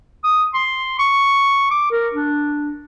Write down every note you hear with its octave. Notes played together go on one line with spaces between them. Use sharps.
D#6
C6
C#6
D6
A#4
D4